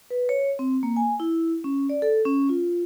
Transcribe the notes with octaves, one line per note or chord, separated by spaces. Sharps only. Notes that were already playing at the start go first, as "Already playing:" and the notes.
B4
C#5
C4
A#3
G#5
E4
C#4
D5
A4
C#4
F4